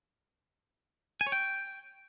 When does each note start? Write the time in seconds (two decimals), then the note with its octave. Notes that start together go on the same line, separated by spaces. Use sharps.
1.21 G#5
1.27 C#5
1.32 G5